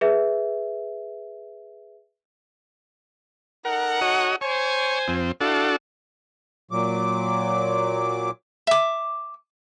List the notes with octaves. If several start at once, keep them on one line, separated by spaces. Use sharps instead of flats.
G#4 B4 E5
D#4 A4 A#4 F#5
F#4 C#5 D#5
C5 C#5 G#5
F2 C4
D4 E4 F#4 A4 F5
A#2 F#3 D6
E5 D6